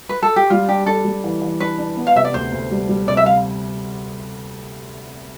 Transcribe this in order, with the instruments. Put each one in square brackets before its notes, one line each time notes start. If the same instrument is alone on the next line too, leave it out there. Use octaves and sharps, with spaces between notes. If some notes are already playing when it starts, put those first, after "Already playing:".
[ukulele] B4
A4
G4
[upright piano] G3 [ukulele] F4
[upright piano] D4 [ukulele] G4
[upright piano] D4 [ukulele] A4
[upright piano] G3
E3
E3
[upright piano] D4 [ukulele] B4
[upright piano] D4
B3
[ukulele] F5
[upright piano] C3 [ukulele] E5
[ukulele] D5
[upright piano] D2 [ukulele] C5
[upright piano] D2
G3
G3
[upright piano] C3 [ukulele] D5
[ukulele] E5
F5